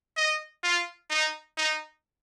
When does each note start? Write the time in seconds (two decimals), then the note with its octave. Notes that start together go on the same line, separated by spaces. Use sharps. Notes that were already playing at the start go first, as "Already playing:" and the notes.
0.17 D#5
0.64 F4
1.10 D#4
1.57 D#4